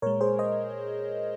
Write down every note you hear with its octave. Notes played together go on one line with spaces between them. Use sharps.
A#2 G#3 A#4 C#5
G#4 C5
C5 D#5